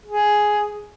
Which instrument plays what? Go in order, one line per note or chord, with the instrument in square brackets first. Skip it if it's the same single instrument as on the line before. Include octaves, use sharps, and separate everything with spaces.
[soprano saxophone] G#4